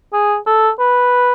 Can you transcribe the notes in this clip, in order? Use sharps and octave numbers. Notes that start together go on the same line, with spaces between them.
G#4
A4
B4